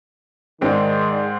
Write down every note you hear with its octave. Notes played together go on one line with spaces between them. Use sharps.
G#2 D#3 G#3 C4 D#4 G#4 D5